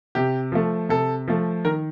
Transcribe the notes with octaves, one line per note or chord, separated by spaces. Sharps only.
C3 G4
F3 A3
C3 A4
F3 A3
D#3 A#4